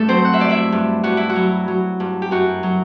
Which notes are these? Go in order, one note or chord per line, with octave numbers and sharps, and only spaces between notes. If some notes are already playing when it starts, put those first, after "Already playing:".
Already playing: G2 A3 A4
F#3 C4 C5
F#5
E5
G2 D5
E4 E5
G2
G2 F#4
E4
F#4
F#3
F#3
G2
G4
F#2 F#4
F#3